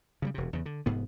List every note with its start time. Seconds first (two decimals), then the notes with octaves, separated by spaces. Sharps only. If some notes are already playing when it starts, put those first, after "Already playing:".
0.22 C#3 F#3 G3
0.34 E1 C3
0.53 E2 C#3
0.66 D3
0.86 F1 G#2 B3